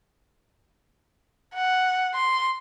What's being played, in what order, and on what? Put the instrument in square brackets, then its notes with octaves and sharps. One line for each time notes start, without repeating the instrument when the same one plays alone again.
[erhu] F#5
C6